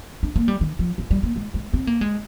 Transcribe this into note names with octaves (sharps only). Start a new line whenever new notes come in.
D4
A#3
G3
D#3
F3
F3
G3
A#3
G#3
G#3
C4
A#3
G#3